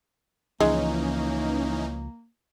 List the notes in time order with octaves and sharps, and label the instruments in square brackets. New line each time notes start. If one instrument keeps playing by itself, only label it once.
[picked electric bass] C#2 F3 [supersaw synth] E3 C#4 D#4 [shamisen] G#3 [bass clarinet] A#3